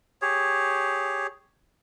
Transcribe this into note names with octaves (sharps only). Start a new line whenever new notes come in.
G4 G#4 C#5